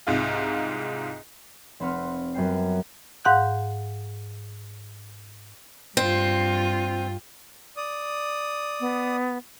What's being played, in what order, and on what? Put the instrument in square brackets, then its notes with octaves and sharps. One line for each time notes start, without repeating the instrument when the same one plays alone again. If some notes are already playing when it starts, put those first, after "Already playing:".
[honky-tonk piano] C2 G#2 F4
[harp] F1 C4 B4 F#5 C#6 F6
F#2 F#3 B3 G5 C7
[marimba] G#2 F5 F#5 F#6 G6
[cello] G2 F4 [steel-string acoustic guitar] C4
[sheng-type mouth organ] D5 D#6
[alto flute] B3